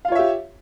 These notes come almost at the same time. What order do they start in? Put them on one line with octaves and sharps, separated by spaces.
F5 F4 C#5 E5 G4